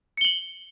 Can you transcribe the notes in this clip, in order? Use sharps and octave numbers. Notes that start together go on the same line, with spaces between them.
C#7 F#7 G7